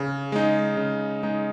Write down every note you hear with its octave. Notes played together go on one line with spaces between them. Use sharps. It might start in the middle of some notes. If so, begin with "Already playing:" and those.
Already playing: C#3
G#3 D#4
C#3
G#3 D#4